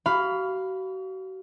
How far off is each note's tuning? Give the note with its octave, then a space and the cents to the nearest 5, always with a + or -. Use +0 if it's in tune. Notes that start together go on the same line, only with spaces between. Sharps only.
F#4 +40 F5 +0 B5 +10